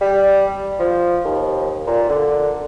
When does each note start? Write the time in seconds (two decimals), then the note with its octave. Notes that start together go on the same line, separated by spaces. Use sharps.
0.01 G3
0.79 F3
1.25 D#2
1.87 A#2
2.09 D3